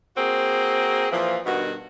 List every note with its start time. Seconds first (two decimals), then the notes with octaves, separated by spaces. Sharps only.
0.16 A#3 C4 F#4 G#4
1.11 A#2 E3 F3
1.46 G2 B2 D#3 F#4